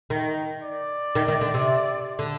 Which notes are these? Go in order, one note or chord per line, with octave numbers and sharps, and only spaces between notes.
D#3
D5
D#3
D#3
D3
C3
D3